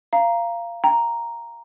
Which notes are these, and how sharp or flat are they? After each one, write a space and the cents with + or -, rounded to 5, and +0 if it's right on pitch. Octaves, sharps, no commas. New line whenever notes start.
F5 -20 A#5 +5
G5 +0 A#5 +0